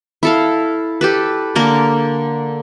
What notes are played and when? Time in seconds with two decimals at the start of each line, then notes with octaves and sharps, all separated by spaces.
0.23 E4 A4 F5
1.01 G4 A4 B4
1.55 D3 A#3 A#4